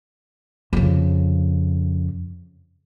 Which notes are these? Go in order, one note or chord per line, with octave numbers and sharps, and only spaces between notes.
F2 C#3